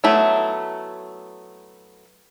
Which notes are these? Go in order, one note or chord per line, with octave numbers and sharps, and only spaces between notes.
F#3 A3 B3 E4